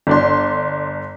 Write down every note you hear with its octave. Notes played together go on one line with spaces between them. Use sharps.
G1 D4 C6